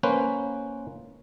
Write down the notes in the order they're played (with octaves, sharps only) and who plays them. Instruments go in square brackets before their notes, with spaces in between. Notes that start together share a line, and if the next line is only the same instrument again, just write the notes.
[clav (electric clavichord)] A#3 C#4 B4 C5